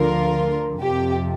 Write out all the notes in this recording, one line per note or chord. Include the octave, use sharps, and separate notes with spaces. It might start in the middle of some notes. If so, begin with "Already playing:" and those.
Already playing: D2 D3 F3 F4 A#4
F2 C3 F3 G4